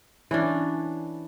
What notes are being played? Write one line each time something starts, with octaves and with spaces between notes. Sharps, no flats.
E3 C#4 D4